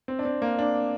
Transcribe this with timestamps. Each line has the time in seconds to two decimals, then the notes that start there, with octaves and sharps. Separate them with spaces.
0.08 C4
0.19 D4
0.25 C4
0.42 A#3
0.59 D4